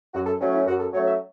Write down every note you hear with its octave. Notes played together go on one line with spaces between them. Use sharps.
F#2 F#4
A4
F#3 A3 C#4
E4
F#2 F#4
A4
F#3 A3 C#4 C#5
E5